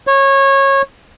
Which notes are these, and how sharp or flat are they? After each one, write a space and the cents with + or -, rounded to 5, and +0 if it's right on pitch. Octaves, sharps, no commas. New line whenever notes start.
C#5 -20